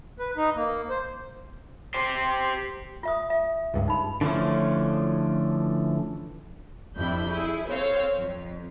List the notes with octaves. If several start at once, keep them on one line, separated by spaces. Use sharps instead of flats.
B4
D#4
A#3
C5
G4 C5
F4 E5 D#6
E5
C#2 G2
D#4 B5
D3 E3 F3 A3 C#4
F2 G3 D4 E4 B5 G6
E4 G#4
C4 A4 C5 C#5 F5
F2